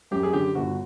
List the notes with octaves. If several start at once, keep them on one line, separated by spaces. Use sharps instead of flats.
F#2 G4
G#4
D3 G4
G1 F#4